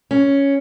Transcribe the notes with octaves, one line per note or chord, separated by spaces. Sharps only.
C#4